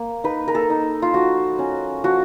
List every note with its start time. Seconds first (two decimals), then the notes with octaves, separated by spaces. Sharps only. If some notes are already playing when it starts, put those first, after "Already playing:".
Already playing: A#3
0.24 D#4 B4
0.48 A#4
0.55 A4
0.70 D#4
1.02 F4
1.14 F3 F#4
1.59 C#4
2.04 F3 F#4